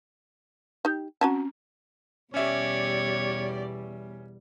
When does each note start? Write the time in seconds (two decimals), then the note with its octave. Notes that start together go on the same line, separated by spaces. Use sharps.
0.85 D#4 G4
1.21 C4 C#4 F#4 G#5 A5
2.34 E2 B2 G3 C#4 G4 C#5 D5 E5